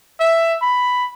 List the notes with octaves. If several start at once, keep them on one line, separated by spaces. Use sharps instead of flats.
E5
B5